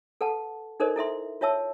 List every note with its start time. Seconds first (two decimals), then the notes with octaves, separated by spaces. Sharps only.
0.21 A4 B4 F#5 A5
0.80 D#4 A4 A#4 C5 D5 D#5
0.96 E4 A4 E5 C6
1.41 F4 C#5 E5 A5 E6